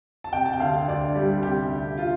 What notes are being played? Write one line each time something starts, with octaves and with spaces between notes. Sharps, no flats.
A5
C3 G5
A5
G5
D2 F5
D2 D5
G3 G4
C3 G4
D2
F4